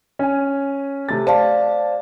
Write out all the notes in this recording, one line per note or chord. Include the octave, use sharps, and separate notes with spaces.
C#4 G#5
C3 A3 A6
C5 D5 F5 A5